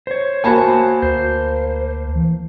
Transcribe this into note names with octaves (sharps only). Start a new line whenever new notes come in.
C5 C#5
A#3 F#4 C5 G#5 A5 B5
D2 C5
E3